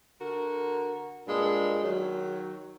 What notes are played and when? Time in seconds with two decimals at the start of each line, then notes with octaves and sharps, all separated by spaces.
0.20 D3 F#4 A#4
1.27 G2 A#2 G#3
1.83 D#3 F#3